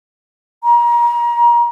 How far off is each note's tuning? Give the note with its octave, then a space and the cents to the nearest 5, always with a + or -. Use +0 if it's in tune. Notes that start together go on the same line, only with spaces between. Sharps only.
A#5 +30